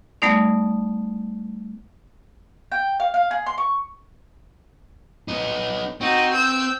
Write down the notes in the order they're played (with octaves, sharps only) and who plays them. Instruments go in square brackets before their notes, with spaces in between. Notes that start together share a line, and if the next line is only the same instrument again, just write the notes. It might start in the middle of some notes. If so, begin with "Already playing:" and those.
[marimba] G3 A3 B3 D#4 D5
[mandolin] G5
F5
F5
G#4
C6
C#6
[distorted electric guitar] B3 D#4
[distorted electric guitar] C4 [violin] D#4 F#4
[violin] E6 G6